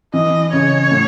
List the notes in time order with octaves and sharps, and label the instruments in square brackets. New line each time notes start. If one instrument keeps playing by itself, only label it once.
[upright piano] E3 [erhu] D#5
[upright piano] C#3 [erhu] C#5
[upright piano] A2